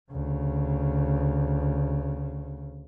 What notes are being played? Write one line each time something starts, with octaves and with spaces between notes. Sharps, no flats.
D2 C#3